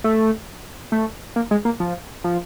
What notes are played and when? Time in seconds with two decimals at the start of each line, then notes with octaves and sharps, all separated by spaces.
0.04 A3
0.92 A3
1.36 A#3
1.51 G#3
1.65 A#3
1.80 F3
2.24 F3